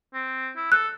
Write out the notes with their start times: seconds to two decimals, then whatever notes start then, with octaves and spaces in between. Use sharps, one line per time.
0.14 C4
0.56 E4
0.72 A4 F#6